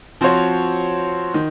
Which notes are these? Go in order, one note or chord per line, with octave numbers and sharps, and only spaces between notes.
F3 C4 F#4 C#5
D#3